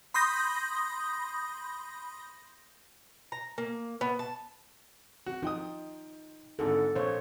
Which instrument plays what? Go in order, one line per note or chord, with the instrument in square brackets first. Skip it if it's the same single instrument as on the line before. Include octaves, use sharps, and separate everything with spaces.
[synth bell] B5 C6 D#6 G6 A#6
[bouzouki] A#5
A#3
B3
A5
[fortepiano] F#4
[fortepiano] F3 G5 D#6 [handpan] D#4
[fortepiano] G#1 G#2 D3 [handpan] A4
[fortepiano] A#1 [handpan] C5 C#5